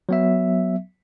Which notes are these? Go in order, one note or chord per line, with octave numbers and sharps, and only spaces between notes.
F#3 B3 E5